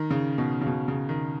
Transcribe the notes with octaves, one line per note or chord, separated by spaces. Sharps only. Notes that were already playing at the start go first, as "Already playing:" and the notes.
Already playing: D#3
C#3
B2
C#3
B2
C#3
D#3